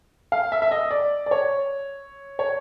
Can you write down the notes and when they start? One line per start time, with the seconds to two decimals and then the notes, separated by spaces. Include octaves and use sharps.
0.32 F5
0.52 E5
0.62 E5
0.71 D#5
0.91 D5
1.26 D5
1.31 C#5
2.39 C#5